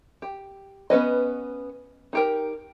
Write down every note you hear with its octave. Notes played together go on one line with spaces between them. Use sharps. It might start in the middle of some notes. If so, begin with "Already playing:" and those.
G4
B3 C#4 B4 D#5
D#4 G4 A#4